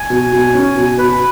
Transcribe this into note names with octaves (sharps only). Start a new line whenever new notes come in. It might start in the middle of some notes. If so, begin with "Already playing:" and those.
Already playing: G#5
B2
B2
C#4
B2
B2 B4